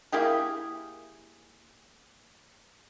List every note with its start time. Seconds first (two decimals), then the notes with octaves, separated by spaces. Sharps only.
0.12 A#3 E4 G4 G#4